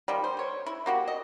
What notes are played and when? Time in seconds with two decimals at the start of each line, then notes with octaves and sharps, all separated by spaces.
0.08 D#3 F3 G3
0.24 C5
0.37 C5 C#5
0.66 E4
0.86 A#3 F#4 G4
1.08 D#5